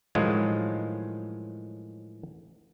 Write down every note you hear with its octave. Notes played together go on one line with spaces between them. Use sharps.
A2 D#3 F3 F#3 G#3 F4